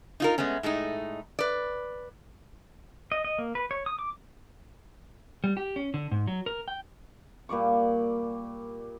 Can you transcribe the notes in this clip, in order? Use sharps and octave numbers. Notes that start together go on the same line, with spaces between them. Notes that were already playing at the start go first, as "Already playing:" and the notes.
D#4 F4 A#4
G#3 A3 B3 C#4
A2 G#3 A3 D#4
B4 D5
D#5
D#5
A#3
B4
C#5
D#6
D6
G3
G4
C#4
D3
G#2
F#3
A#4
G5
A#2 G3 D5 C#6